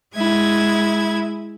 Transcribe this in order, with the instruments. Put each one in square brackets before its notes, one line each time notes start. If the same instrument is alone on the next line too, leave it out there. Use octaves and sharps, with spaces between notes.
[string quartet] G#3 E4 G#6